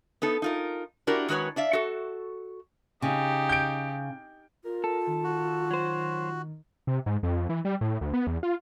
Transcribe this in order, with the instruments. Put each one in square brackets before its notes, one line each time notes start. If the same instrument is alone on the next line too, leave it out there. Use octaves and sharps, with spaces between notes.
[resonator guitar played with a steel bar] B3 D#4 A4
D#4 F4 A#4
D4 E4 F#4 G4 A#4
D#3 G#3 F#4 B4 C#5
D4 D5 E5 F5
F#4 A4
[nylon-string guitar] C#3 [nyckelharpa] D#4 G4
[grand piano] G6 D7
[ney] F4 [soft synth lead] A#4
[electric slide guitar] A4
[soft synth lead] D#3
[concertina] F#4
[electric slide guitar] F#3 C5
[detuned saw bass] C3
G#2
F2
E3
G3
A2
D2
B3
E2
F4